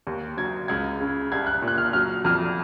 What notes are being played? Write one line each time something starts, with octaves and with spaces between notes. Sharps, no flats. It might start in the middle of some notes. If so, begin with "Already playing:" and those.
D#2
F#3 G#6
C#2 G#6
C#3
C2 G#6
F#6
A#2
F#6
F6
F#3 F6
F2 F6